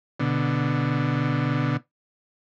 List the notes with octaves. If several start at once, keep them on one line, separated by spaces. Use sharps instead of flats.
B2 D3